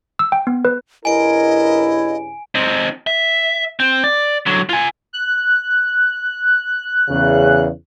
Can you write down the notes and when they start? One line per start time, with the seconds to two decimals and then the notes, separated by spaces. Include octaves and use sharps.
0.19 E6
0.32 G5
0.47 B3
0.65 B4
1.05 G2 C#3 E4 A#4 D#5 G#5 D7
2.55 C4 D#4
3.07 E5
3.80 C4
4.04 D5
4.46 D3 F#3
4.69 F4 G#5
5.13 F#6
7.09 E2 C#3